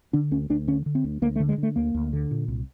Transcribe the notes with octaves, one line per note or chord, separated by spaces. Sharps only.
D3 D4
D2 C#4
D2 D4
D3 C#4
D3
C4
D2
D2 A#3
A3
D3
G#3
D3 A3
D2 A#3
D2
D3
A#2
C2